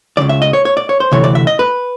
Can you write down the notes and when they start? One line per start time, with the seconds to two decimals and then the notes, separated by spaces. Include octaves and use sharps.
0.17 C#2 C#3 E3 D5
0.29 E5
0.42 D#5
0.53 C#5
0.65 C#5
0.77 D5
0.89 C#5
1.00 C5
1.12 D2 C3 E3 A3 C#5
1.24 D5
1.35 E5
1.47 D#5
1.59 B4